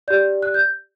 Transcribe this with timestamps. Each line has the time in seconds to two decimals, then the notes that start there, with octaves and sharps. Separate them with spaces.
0.08 G4 D5 G6
0.43 F#6
0.54 G6